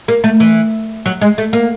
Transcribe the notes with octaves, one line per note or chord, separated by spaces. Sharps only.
A#3
A3
E3
F#3
G#3
A3
A#3